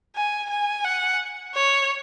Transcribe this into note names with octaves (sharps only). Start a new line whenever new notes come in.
G#5
G#5
F#5
C#5